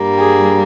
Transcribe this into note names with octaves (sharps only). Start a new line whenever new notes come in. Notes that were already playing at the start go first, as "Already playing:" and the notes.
Already playing: G2 G3 A#3
G#4